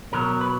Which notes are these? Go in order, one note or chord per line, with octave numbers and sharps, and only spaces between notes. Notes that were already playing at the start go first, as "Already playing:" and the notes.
B1 B2 F#3 A#4
B4